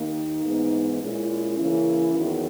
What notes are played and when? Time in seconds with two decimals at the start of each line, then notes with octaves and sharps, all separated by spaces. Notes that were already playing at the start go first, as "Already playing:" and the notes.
Already playing: D#2 D#3 A#3 D#4
0.44 G#2 E3 B3
1.01 A#2 G#3 C#4 E4
1.57 C#3 E3 A#3 C#4
2.15 E2 D#3 F#3